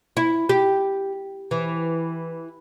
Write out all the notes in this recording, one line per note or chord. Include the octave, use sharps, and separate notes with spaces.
E4
G4
E3